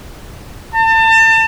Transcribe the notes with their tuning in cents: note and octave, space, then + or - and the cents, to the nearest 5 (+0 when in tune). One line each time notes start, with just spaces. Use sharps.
A5 +30